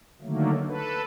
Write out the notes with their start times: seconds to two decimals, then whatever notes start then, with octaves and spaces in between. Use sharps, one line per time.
0.22 D3 D#3 F#3 A3 A#3
0.68 A4 B4